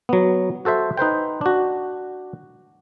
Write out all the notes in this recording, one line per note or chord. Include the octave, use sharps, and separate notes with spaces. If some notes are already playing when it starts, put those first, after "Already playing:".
F#3 B3
F#4 A4 C5 E5
D#4 B4 C5 G5
D4 F#4